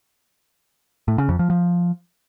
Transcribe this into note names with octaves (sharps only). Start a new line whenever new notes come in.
A2
C#3
F2
F3
F3